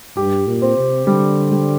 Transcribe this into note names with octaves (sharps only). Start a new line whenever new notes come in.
G2 G4
A#2
C4
C3
D3 G3
G3